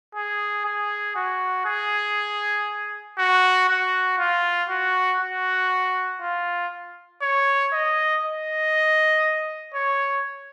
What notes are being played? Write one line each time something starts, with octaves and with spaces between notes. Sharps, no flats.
G#4
G#4
F#4
G#4
F#4
F#4
F4
F#4
F#4
F4
C#5
D#5
D#5
C#5